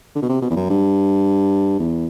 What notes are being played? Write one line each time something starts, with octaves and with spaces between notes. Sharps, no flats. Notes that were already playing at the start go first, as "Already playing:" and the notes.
D3
B2
C3
B2
E2
F#2
G2
E2